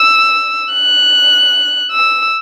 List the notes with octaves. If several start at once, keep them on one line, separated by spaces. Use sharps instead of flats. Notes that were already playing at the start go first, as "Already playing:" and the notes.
Already playing: E6
F#6
E6